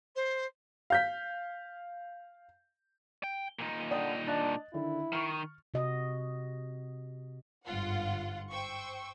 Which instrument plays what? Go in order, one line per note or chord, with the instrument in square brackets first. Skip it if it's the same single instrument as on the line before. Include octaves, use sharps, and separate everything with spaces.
[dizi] C5
[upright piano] F5 G6 B6
[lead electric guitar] G5
A#2 D#4
[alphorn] D3 [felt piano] D5 G5 D#6
[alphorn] D4 [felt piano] D#5 F#6 A6
[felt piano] D3 D#3 [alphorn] E4
[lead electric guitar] D#3 [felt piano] C#6 F6
[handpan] C3 F#4 D#5
[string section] G1 G#2 F4 F#5
C5 G5 C#6 E6